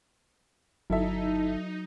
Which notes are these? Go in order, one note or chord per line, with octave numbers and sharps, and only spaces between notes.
G1 F#3 D#4 E4 A4 E5